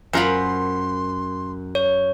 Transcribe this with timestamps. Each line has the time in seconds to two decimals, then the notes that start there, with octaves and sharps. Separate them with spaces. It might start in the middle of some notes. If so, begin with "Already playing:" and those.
0.13 F#2 F4 A#4 C5 B5 C6
1.75 C#5